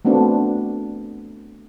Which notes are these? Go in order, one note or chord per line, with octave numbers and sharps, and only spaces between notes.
A3 B3 C4 D4 F#4